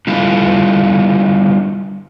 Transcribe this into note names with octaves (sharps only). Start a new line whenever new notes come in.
D3 G3 E4 F4